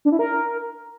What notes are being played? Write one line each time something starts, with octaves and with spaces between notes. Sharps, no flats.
D4
E4
A#4